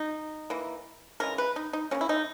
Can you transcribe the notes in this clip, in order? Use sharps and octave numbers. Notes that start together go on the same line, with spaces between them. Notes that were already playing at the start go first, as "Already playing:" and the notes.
Already playing: D#4
E3 A#3
C#3 E3 G#3 A#4
B4
D#4
D#4
C#3 G3 A#3 C#4
E4
D#4